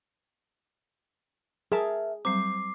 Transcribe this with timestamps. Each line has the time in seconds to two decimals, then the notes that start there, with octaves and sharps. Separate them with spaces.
1.72 G#4 A#4 E5 A5
2.25 F#3 G3 C4 C5 D6 C7